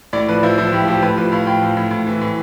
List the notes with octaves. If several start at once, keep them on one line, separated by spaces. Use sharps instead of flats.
A2 D5
F3 B4
F3 E4
F3 E4
A2 G4
F3 G4
A2 B4
F3 B4
A2 F5
A2 G5
F3
A2
A2
E3
A2